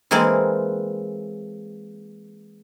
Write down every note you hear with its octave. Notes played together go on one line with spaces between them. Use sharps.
E3 G#3 A#3 C4 D5